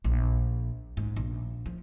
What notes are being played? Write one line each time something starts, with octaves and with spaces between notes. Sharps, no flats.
A#1
G#2
A#1
F3